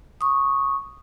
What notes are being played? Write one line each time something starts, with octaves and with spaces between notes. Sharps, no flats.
C#6 D#6